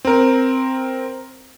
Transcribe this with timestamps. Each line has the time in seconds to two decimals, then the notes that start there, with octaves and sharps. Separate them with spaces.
0.05 C4 A#4